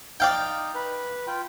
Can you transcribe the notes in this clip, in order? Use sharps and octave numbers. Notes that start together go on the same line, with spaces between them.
D#4 D5 F5 G5
B4
F4 G5